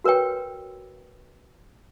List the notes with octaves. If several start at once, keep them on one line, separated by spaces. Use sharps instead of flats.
F#4 A#4 B4 C#5 G5